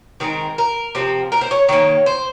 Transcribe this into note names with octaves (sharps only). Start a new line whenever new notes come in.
D#3 G#3 C4 A#4
A#4
C3 F3 C4
A#4
C5
C#5
D#3 A#3 C#5
C5